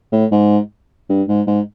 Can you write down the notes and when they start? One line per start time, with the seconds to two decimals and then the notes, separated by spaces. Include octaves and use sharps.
0.12 A2
0.31 G#2
1.09 G2
1.28 G#2
1.47 G#2